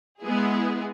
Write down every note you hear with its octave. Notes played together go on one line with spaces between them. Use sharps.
G#3 B3 E4 G#4